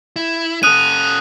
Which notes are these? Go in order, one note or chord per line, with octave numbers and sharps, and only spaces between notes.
E4
C#4 A4 D#6 F#6 D#7